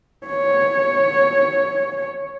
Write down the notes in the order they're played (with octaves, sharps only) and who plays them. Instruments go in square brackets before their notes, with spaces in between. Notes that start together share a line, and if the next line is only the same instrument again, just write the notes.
[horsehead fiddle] C#5